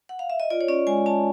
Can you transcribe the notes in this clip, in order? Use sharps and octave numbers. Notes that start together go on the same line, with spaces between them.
F#5
F5
E5
D#5
F4 D5
C#5
C#4 D5
G#3 G#5
C#4 A5